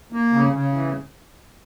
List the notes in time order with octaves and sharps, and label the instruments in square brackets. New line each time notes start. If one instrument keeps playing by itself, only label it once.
[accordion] A#3
C#3
C#3
E3